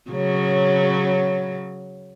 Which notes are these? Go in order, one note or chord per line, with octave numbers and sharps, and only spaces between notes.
C#3 F#3